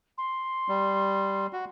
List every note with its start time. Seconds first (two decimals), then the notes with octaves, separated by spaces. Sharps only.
0.18 C6
0.69 G3
1.53 F#4